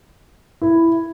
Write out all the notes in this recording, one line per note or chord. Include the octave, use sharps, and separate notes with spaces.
E4